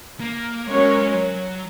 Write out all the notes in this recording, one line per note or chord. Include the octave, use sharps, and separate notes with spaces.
A#3
F#3 G#3 C#4 A#4 C#5
F#3